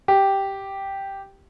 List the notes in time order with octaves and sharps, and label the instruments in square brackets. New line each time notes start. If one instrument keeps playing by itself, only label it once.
[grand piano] G4